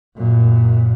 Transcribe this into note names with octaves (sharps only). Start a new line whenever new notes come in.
F#2 A#2